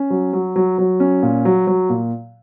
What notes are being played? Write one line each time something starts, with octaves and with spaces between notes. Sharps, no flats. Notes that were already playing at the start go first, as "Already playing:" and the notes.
Already playing: C#4
F#3
F#3
F#3
F#3
C#4
A#2
F#3
F#3
A#2